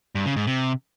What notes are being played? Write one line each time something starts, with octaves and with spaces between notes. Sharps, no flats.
G2
C#3
G#2
C3